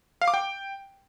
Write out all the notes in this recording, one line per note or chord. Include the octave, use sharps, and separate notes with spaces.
F5
D6
G5